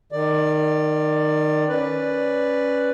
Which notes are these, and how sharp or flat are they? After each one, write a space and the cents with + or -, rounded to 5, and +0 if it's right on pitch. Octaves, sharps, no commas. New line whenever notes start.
D#3 -15 D5 +15
C#4 +0 B4 +0 D5 +0